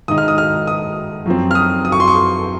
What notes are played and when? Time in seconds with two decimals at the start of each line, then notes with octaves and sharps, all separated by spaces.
0.08 G#2 D#3 G#3 D#4 D#6
0.18 F6
0.28 D#6
0.38 F6
0.67 D#6
1.26 F#2 F3 C4
1.51 F6
1.55 D#6
1.85 D#6
1.92 C#6
2.00 C6
2.08 C#6